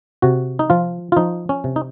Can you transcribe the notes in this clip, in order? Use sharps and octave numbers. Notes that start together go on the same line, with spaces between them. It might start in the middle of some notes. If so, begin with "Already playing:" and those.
C3 F#4
D#4
F3 F4
F4
F3 D#4
C#4
C3
D#4